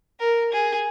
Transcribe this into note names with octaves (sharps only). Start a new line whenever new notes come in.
A#4
G#4